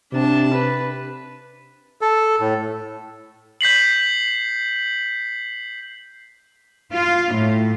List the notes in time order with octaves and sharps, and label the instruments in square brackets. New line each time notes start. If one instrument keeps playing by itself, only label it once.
[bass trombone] C3 [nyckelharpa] D4 A5
[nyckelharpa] B4
[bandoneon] A4
A2
[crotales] G6 B6 C7 F#7
[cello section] F4
A2